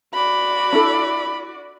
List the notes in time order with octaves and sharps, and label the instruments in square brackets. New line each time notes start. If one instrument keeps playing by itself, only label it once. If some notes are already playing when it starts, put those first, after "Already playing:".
[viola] F#4 D5 [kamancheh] B5
[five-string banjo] D4 E4 A4